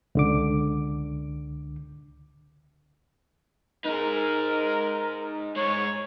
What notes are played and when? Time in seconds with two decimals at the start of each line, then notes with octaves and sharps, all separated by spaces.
0.15 C#2 D3 D6
3.85 D#4 G#4 A#4
5.56 G#2 G#3 C#5